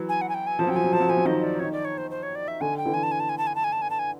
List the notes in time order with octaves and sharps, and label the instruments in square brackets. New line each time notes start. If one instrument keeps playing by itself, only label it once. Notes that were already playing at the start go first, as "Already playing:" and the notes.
Already playing: [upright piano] E3 F#3
[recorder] G#5
F#5
G#5
G5
G#5
[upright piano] F3 [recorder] A5
[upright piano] F#3 [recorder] G5
[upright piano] F3 [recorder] G#5
[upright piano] F#3
[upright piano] F3 [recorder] A5
[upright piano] F#3
[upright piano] F3 [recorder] G#5
[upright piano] F#3
[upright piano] D#3 F3 [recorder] D#5
[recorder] D5
[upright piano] D#3 [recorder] C#5
[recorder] D5
C#5
C5
C5
C#5
D5
E5
[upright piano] D3 [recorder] G#5
[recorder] G5
[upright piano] D3 E3
[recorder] G#5
A5
G#5
A5
G#5
A5
G#5
A5
G#5
A5
G#5
A5
G#5